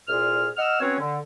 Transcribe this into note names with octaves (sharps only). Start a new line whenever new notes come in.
C2 A#2 G#4 F6
D#5 F#5 E6 F6
F#3 C4 C#4 B4 C#5
D3